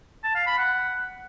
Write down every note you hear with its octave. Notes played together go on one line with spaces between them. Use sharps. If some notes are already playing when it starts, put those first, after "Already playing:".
A5
F5
B5
F#5